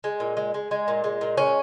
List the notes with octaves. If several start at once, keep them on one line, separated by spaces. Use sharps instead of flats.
G#3
A#2
G#3
G#3
G#3
A#2
G#3
A#2
G#3 C#4